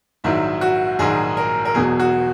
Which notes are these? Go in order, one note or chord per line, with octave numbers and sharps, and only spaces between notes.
A#1 G#2 D#3 F#3 E4
F#4
A#1 G#2 D#3 F#3 G#4
A#4
A#4
E1 E2 B2 F#3 G#4
F#4